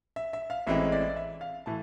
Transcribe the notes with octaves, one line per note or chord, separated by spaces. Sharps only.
E5
E5
F5
A1 A2 E3 G#3 C4 E5
D5
E5
F5
A2 E3 A5